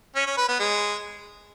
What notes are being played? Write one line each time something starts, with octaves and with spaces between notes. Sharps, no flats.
C#4
C#4
B4
B3
G#3